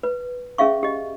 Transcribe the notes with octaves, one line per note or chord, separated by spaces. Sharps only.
B4
C#4 G#4 E5 F5 C#6
G4 D#5